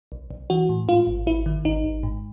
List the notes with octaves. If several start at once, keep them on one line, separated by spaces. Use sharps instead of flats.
B1
B1
E3 F#4
A2
G#2 F4
G#1
G#1 E4
D#3
G#1 D#4
G#1
G#2